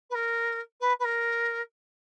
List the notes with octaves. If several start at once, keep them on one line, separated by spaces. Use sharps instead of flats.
B4
A#4
B4
B4
A#4